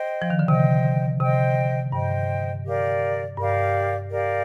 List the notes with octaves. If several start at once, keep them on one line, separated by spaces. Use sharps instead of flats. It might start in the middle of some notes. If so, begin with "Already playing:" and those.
Already playing: C5 D#5 G5
F3
D#3
D3
C3 C5 D#5 G5
C3 C5 D#5 G5
G2 C5 D#5 G5
G4 A#4 D5 F5
G2 G4 A#4 D5 F5
G4 A#4 D5 F5